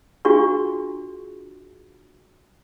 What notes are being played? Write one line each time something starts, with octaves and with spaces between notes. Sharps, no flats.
D4 F4 F#4 G#4 C#6